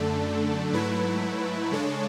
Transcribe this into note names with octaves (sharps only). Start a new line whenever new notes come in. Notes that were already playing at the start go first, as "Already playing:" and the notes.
Already playing: F#2 D3 A3 D4 A4
G#2 F#3 A3 E4 B4
C#3 G#3 D4 A4 C#5